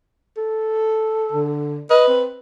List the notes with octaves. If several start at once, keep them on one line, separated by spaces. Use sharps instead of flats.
A4
D3
B4 D#5
C4